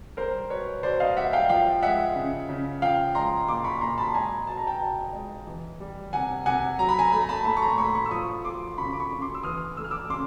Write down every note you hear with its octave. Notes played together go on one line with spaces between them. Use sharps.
G3 A#4 C5
B2 B4 C#5
B2 C5 D5
D#5 F5
G3 E5 F#5
F5 G5
F3 F5 G5
G#3 E5 F#5
C#3
C#3
F3 F5 G5
G#3 A#5 C6
A#2 C6 D6
B5 C#6
A#2 A#5 C6
A5 B5
G#3 G#5 A#5
B2 A5
A#5
G5 A5
B2
G#3
E3
G3
C3 F#5 G#5
C3 F#5 G#5
F#3 A#5
B5
G#5 A#5
A3 B5
A#5
A5 B5
A2 A5 B5
C#6
A#5 C6
A2 B5 C#6
B5 C#6
E6
F3 C#6 D#6
A3 C6 D6
C#3 B5 C#6
D6
B5 C#6
C#3
C6 D6
E6
E3 D#6 F6
A3 E6
F6
D6 E6
C#3 C6 D6